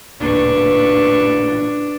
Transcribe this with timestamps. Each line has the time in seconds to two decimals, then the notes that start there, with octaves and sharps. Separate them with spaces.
0.21 D1 A1 A#2 C#3 D4 B4 C#6